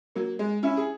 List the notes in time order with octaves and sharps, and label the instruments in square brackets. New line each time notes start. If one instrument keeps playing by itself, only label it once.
[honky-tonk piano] F#3 A#3
G#3
C#4 E4
G#4